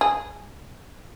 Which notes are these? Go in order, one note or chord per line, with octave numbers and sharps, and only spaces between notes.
G#4